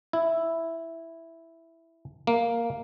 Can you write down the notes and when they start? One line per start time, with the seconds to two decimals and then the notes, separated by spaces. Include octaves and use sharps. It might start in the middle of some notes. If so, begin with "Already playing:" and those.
0.13 E4
2.27 A#3